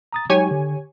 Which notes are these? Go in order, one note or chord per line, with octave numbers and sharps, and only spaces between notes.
A#5 D#6 A6
F#3 G#3 D#4 G4 C#5 G#5
D3